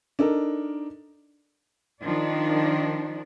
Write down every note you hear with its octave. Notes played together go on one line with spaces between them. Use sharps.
D4 D#4 A4 A#4
D#3 F3 D4